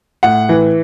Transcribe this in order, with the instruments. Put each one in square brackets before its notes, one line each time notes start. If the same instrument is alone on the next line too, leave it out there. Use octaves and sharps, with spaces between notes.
[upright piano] A2 F#5
E3